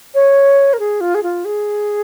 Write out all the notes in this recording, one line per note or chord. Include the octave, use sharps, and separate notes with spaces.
C#5
A#4
G#4
F4
G#4
F4
G#4